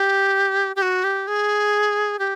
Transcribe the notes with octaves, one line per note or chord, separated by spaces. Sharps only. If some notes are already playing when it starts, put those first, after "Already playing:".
Already playing: G4
G4
F#4
G4
G#4
G4